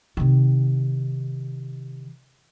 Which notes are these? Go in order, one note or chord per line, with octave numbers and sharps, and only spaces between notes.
C3 D#3